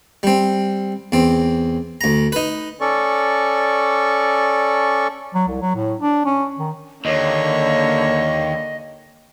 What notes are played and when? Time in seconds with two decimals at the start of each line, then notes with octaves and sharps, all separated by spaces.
0.23 G3 C4
1.12 E2 C4
2.01 D2 A#5
2.32 D#4 B4
2.81 C#4 A4 D5 C#6
5.34 F#3
5.48 C2
5.61 F#3
5.76 A2
6.00 D4
6.26 C#4
6.59 D#3
7.05 D#2 D3 A#3 C#5 D#5